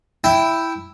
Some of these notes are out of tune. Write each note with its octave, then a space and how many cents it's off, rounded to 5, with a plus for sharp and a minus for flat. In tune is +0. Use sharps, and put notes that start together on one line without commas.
E4 +0 G5 +0